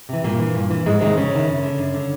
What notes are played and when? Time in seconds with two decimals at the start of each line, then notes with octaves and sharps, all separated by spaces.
0.09 C3 E3
0.24 G2 A#2 A#3
0.39 E3
0.55 G2
0.70 E3
0.85 F2 G#2 G#3
1.00 G#2 C3 D#3 G#3
1.17 F2 C#3 C#4
1.31 C3 D#3
1.48 F#2
1.63 D3
1.78 F#2
1.94 D3